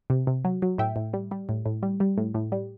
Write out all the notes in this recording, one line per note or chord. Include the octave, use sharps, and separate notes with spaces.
C3
C3
F#3
F#3
A2 E5 G5
A2
G3
G3
A2
A2
G3
G3
A2
A2
G3